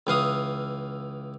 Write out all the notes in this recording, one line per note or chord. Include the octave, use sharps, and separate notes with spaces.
C#2 E3 F5 D#6